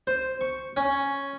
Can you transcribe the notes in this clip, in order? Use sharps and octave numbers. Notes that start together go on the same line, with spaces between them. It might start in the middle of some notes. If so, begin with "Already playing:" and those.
C5
C#6
C#4